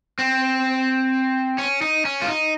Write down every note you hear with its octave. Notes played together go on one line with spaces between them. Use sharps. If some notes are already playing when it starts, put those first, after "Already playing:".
C4
C#4
D#4
C#4
F4
D#4